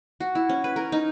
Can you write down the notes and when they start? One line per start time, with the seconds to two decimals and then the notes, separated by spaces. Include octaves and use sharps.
0.20 F#4
0.35 E4
0.49 C#4
0.64 B4
0.76 A#4
0.92 D#4